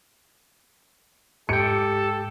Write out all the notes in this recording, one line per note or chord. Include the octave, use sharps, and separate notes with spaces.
G#2 G4 A4 G5 C#7